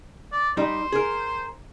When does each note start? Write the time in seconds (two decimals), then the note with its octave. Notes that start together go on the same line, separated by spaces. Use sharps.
0.32 D5
0.57 G3 D#4 G4 C5
0.92 G#4 A#4